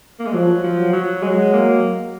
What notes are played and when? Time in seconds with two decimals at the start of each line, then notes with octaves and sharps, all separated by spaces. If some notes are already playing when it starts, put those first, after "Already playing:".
0.20 A#3
0.26 G#3
0.33 F3 F#3
0.64 F3
0.79 F#3
0.93 F#3
1.23 F#3 G#3
1.54 A#3